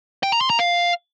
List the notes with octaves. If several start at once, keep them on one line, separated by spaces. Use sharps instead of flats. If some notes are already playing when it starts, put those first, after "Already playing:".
G5
A#5
C6
A#5
F5